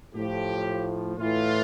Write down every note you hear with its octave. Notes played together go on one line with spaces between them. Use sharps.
A2 F3 G4
A2 E3 F4